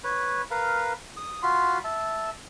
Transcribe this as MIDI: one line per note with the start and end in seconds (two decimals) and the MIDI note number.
0.04 0.42 71
0.04 0.42 73
0.51 0.93 70
0.51 0.93 71
0.51 0.93 77
1.17 1.42 87
1.43 1.78 65
1.43 1.78 66
1.43 1.78 83
1.43 1.78 84
1.84 2.30 76
1.84 2.30 81